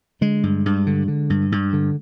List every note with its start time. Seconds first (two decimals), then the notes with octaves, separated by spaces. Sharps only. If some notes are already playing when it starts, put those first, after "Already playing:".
0.21 D3 G#3
0.43 G2
0.66 G2
0.87 D3
1.08 D3
1.30 G2
1.52 G2
1.73 D3